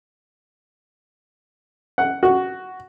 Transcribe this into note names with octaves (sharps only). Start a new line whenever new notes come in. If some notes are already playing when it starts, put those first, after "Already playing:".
F#5
F#4